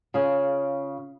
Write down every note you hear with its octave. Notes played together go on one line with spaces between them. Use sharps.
C#3 F4 G#4